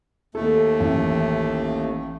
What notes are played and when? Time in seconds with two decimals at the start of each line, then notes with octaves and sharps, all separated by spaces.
0.35 D#2 A3 A4
0.80 A1